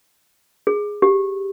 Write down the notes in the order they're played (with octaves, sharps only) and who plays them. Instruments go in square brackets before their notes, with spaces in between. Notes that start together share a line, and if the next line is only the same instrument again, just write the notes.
[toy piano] G#4
G4